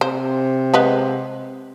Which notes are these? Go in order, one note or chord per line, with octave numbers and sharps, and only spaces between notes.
C3 C5
G#3 B3 B4